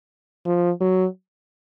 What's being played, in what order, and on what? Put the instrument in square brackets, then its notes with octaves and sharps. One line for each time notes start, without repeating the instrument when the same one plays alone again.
[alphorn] F3
F#3